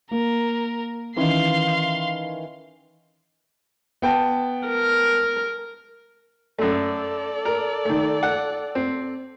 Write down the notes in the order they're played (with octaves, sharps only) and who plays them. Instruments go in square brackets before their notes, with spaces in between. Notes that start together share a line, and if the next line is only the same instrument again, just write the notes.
[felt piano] A#3 [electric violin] A#4
[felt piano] D#3 E3 C#4 [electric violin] F5 C6
[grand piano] B3 G5 A5
[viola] A#4
[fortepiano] F#2 A3 [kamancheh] A4 D5
[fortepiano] A#4
D#3 A3
F#5
C4